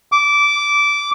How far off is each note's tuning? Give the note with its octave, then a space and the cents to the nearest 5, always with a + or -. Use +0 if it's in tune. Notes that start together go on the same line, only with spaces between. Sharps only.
D6 -15